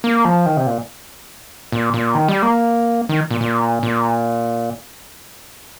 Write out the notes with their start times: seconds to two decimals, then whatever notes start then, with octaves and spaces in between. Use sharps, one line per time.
0.04 A#3
0.25 F3
0.46 D#3
0.57 C3
0.67 A#2
1.72 A#2
1.94 A#2
2.15 D#3
2.28 G3
2.42 A#3
3.09 D#3
3.31 A#2
3.41 A#2
3.83 A#2